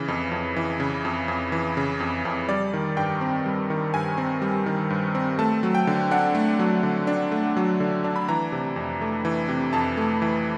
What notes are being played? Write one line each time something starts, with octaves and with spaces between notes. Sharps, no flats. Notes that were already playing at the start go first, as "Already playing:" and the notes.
Already playing: C#3 E3
F2
F2
E3
C#3
F2
F2
E3
C#3
F2
F2
G3 D5
D#3
G2 G5
C4
G3
D#3
G2 G#5
C4
G3
D#3
G2
C4
A3 A5
F#3
G5
D3
D4 F#5
A3
F#3
D3
D4
A3
F#3
D3
D4
B5
E3 A#5
C3
F2
A3
E3
C3
F2 A5
A3
E3